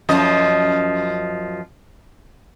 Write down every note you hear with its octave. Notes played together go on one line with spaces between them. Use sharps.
F#2 F3 D#5